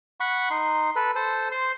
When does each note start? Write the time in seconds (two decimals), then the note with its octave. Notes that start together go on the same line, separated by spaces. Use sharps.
0.20 F#5 B5 C#6
0.50 D#4 C6
0.96 A4 B4
1.16 A4 C5
1.52 C5 C6